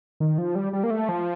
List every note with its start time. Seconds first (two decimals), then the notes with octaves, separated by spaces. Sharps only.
0.20 D#3
0.38 F3
0.55 G3
0.73 G3
0.84 A#3
0.90 A3
1.09 F3